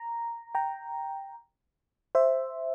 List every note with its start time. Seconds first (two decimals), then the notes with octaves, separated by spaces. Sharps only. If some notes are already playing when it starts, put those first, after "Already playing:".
Already playing: A#5
0.55 G5 A#5
2.15 C5 E5